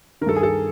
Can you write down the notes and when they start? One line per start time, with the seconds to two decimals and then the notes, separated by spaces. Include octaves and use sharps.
0.21 D#3 A#4
0.26 G2 A4
0.36 G#4
0.43 A4